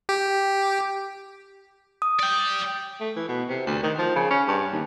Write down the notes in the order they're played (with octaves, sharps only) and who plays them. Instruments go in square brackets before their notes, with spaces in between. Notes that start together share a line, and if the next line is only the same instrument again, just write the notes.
[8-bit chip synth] G4
[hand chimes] D#6
[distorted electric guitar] D5 G5
[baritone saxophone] A3
E3
B2
C3
D2
D#3
F3
C#3
C#4
G2
D#2